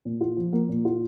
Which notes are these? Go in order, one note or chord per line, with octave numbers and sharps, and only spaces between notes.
A#2
F4
F3
A#3
A#2
F4